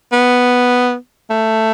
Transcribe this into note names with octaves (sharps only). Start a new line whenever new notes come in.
B3
A3